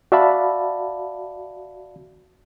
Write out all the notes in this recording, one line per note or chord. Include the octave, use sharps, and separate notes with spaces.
F#4 D5 E5 F5 A5 B5